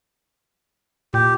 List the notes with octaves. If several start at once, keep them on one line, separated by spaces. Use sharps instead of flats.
A#2 G4